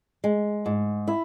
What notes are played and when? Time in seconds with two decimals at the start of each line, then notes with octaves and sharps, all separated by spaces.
0.24 G#3
0.66 G#2
1.08 E4